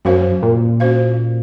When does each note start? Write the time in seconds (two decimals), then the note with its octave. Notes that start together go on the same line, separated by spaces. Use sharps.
0.05 F#2 C#4 F#4 C5 F5
0.43 A#2
0.80 C#4 F#4 C5 F5